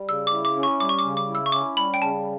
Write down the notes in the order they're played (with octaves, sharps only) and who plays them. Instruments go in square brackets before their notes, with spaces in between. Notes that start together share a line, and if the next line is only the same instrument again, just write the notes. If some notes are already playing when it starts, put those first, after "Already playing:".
Already playing: [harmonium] G3
[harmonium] C#3 [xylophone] E6
[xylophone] D6
[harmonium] E4
[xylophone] D6
[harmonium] C#4
[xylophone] C#6
[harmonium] G3 [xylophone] D6
[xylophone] C#6
D6
[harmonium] C#3
[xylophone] D6
[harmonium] E4
[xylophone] E6
C#6
[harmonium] C#4 [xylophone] D6
[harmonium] G3 [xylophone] B5
[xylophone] G5
[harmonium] C#3 [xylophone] A5